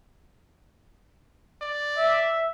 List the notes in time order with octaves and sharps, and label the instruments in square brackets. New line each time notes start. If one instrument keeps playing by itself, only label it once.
[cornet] D5
[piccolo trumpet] E5